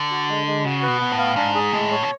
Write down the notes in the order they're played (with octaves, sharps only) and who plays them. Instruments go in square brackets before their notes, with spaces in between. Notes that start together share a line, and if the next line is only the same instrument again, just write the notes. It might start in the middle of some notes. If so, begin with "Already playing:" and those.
Already playing: [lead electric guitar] D3
[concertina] F#4
G#3
G#3
[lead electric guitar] C#3 [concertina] F#4
[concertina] B4
[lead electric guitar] B2
[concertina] B3
[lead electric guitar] A2
[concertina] F5
[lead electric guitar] G#2 [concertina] D4
[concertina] G#4
[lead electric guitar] A2 [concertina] G#3
[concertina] C#5
[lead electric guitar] B2